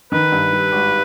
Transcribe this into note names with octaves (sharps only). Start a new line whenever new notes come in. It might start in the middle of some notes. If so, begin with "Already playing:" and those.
D#3 B4
G2
G3
G#1